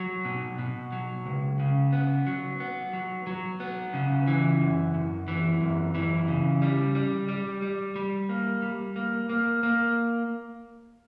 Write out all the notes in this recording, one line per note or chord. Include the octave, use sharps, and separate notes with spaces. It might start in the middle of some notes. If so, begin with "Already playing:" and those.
Already playing: F#3
B2
B2
F#3
C#2
C#3
B3
F#3
B3
F#3
F#3
B3
C#3
E3
F#2
F#2
E3
F#2
E3
C#3
G3
G3
G3
G3
G3
A#3
G3
A#3
A#3
A#3